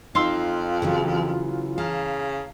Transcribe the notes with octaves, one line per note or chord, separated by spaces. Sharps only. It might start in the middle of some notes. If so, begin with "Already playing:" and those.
F2 D#4 F4 F5 C6 E6
C#3 E3 F#3
C#3 F5 A5 A#5